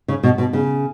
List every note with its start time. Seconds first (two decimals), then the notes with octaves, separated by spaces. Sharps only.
0.08 C#3
0.24 B2
0.38 B2
0.53 C#3